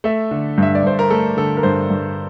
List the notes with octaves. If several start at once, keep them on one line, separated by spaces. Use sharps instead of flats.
A3 E5
D3
G2 E5
D5
G2 C5
A#4
A3 A4
D3 A4
A#4
G2 C5
G2